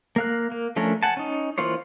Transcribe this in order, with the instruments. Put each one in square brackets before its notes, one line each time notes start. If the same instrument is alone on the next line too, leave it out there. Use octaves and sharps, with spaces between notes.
[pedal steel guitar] A#3 F5 F#6
A#3
F3 A3 C#4 D4 A#4
F#5 G#5 A5
C#4 D#4
E3 A#3 F4 C5 C#5